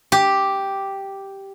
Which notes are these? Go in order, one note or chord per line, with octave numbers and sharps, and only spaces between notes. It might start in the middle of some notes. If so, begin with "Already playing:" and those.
G4